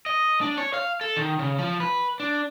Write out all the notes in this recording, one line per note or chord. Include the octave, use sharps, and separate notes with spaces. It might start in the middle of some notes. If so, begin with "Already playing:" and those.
D#5
D4
C#5
F5
A4
D#3
C#3
F3
B4
D4